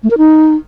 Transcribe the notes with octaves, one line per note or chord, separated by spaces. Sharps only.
A3
A#4
D#4